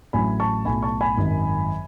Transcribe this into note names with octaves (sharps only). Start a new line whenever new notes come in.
A1 A2 F#3 G#5 B5
A5 C#6
B1 A2 F#3 G#5 B5
A5 C#6
G#5 B5
G#1 F#2 D#3 F#3